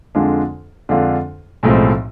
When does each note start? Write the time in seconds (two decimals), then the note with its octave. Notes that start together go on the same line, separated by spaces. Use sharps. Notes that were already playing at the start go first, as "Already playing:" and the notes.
0.15 F2 D3 G#3 D4 F4
0.89 F2 D3 G#3 D4 F4
1.63 B1 A2 F3 G#3 C4